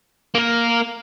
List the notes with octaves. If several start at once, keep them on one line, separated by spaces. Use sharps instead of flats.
A#3 A#4